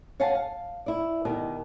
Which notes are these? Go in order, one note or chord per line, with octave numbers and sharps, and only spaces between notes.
C#5 F5 F#5 G#5 A5
F5
E4 D5
B2 D#3 G4